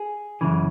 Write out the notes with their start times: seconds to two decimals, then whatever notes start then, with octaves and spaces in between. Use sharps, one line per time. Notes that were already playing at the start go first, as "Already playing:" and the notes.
Already playing: G#4
0.41 F#2 C#3 E3